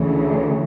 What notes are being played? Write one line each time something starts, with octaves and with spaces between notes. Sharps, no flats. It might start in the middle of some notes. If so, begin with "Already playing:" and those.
Already playing: D2 C#3 E3